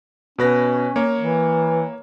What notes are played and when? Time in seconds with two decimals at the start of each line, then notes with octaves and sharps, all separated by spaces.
0.38 B2 C#4 B4 A#6
0.96 A#3 C#5
1.19 E3